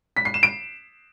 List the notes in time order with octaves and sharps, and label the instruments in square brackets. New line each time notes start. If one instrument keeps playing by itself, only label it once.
[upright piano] B6
C7
E7
D7